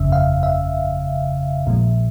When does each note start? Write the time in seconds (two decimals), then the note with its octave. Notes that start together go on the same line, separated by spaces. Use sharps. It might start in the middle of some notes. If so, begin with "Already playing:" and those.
Already playing: G1 F2 C#3 E5
0.12 F5
0.43 E5
1.66 A#1 A#2 F3 G#3